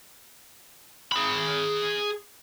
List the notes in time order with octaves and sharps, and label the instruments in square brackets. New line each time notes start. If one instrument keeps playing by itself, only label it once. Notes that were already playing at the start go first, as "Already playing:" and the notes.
[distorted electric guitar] G#4 B5